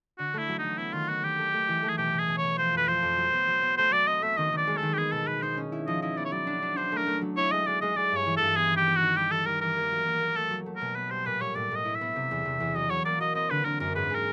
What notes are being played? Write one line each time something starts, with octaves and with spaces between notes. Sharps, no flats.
D3 F#4
A3 E4
F#3
D#4
F#3
B3 E4
D#3 F4
B3 F#4
D#3 G4
A3
A3
E3
A3
G#4
B2 G4
B2
G#4
B2
C#5
B2
F3 C5
F2 B4
F3 C5
F2
F#3
B3
F#3
B3
A3 C5
F#3 D5
C4 D#5
A3 E5
D#3 D#5
D#3 D5
G#3
A4
D#3
G4
B3 G#4
B2 A4
B2 B4
D#4 C5
C#4
E4
F3 D#5
E4 D#5
B3 D5
C#5
F#3 D5
D4
D4
D4 C5
A3 A#4
A3
F#3
E4 C#5
G#3 D#5
G#3 D5
G#3 D#5
G#3 D5
G2 C#5
E3
G2 A4
B3 G#4
D#3
G4
B3
F#4
D#3
G3 G4
E3 A4
G3 A#4
E3 A#4
A#3
F#3
A#3
A#3
A3 A4
F#3
A3
A#4
B2
B3 B4
G3 C5
A#2 B4
G3 C#5
A2 D5
A2 D#5
E4
E5
B3
C3
E2
C3
E2
F#3 D#5
F#3 C#5
A#3 D5
F#3 D#5
C4 D#5
D3 B4
D3 A#4
F#2 A#4
G#2 B4
G#3
A#4